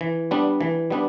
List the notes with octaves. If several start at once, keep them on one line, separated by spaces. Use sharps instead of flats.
E3
G3 B3 D4
E3
G3 B3 D4